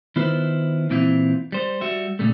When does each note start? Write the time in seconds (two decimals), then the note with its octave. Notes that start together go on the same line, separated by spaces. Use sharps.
0.16 D#3 B3 E4 F4 B4 C5
0.90 A#2 E3 C4 E4 F4
1.52 G3 C5
1.81 G3 F#4 E5
2.19 A#2 C#3 G3 A3